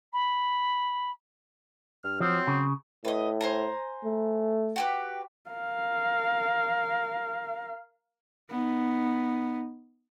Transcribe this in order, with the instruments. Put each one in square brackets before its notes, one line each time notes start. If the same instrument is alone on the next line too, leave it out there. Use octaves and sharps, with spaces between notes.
[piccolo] B5
[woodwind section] G2 F6
[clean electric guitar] F3 [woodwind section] F#3 C4
[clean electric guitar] C#3
[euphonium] A2 [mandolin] B4 D#5
[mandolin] C5 G#5 A#5
[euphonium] A3
[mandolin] F#4 G4 B4
[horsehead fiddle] A#4 F5
B3 D#4